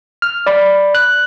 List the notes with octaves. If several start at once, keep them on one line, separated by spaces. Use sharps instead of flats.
F6
D5 B5
F#6